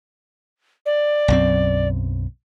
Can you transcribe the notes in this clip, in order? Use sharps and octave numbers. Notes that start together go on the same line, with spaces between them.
D5
B1 F#2 C4